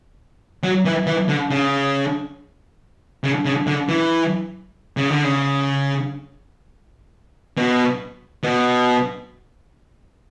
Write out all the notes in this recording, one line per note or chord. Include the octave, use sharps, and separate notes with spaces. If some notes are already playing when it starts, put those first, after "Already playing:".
F#3
E3
E3
D3
C#3
C#3
C#3
D3
E3
C#3
D3
C#3
B2
B2